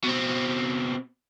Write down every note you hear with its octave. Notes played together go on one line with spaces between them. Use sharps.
B2 C4